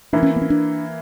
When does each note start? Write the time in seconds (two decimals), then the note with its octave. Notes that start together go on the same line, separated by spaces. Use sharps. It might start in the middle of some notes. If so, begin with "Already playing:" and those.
0.13 E3 A#3 D4 E4
0.23 C#4
0.36 B3
0.42 C#4
0.50 D4